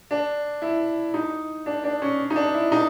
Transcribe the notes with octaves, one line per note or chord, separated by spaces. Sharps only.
D4
E4
D#4
D4
D4
C#4
D#4
D4
E4
D#4